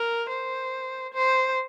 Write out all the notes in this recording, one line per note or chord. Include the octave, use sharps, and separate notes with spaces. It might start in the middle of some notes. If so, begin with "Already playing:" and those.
Already playing: A#4
C5
C5